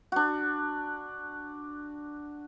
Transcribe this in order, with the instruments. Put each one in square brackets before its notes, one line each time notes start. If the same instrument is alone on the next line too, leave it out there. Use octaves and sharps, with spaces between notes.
[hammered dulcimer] D4 F#4